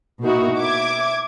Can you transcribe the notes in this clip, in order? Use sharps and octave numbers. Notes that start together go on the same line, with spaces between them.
B2 A#3 D#4 E4 F#4
E5 D6 G#6